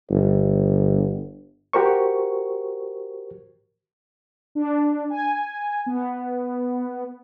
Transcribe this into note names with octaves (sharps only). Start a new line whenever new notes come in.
G1
F#4 G4 A#4 C5 C#6
D4
G#5
B3